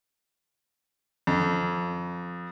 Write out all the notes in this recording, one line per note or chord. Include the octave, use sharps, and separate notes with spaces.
F2